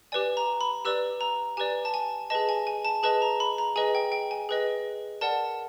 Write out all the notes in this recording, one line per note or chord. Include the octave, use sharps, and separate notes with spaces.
G4 B4 D5 G#5
A#5
B5
G4 B4 D5 E6
A#5
G4 B4 D5 G#5
A5
G#5
G#4 B4 D#5 A5
G#5
G#5
A5
G#4 B4 D#5 A5
A#5
B5
A#5
G#4 B4 D#5 G#5
G5
G5
G#5
G#4 B4 D#5
A#4 D5 F#5 A5